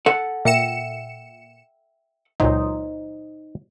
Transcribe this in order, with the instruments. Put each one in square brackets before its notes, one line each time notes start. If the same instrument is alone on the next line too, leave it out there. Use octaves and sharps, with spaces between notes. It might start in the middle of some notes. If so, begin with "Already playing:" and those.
[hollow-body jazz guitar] A4 F#5
[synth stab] A#2 C#7 E7 [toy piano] E5 G5 E6
[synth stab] C#2 A#2 F#3 [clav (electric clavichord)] D#4 C5 D#5